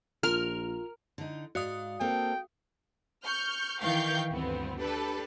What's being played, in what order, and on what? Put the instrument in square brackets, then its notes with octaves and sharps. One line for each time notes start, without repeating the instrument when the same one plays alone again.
[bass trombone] A#1 [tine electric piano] F4 [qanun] A#4 [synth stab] F6
[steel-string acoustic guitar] D3 D#4
[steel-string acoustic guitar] G#2 D5 [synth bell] F#4 F5 D#6
[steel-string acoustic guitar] A#3 C4 A4 [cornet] G5
[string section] C#6 F6 G6
D#3 E3 F5 G5 C#6 G6
D2 G2 B3 C4
D4 G4 A4 B4